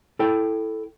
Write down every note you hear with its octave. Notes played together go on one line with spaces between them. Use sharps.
E4 A4 C#5 G5